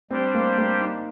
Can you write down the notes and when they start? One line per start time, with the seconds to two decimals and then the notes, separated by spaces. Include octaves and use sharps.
0.10 G3 C4 D4 G4 C5
0.34 A#3
0.58 A#3
0.80 D#4